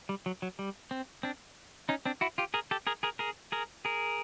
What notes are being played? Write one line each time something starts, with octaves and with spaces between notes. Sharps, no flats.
G3
F#3
F#3
G3
C4
C4 D4
C#4 D#4
C4 D4
E4 F#4
F4 G4
G#4 A#4
G4 A4
G#4 A#4
G#4 A#4
G#4 A#4
G#4 A#4
G#4 A#4